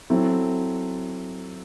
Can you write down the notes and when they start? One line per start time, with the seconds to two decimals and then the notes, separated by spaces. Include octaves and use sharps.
0.10 F#3 C4 E4 A4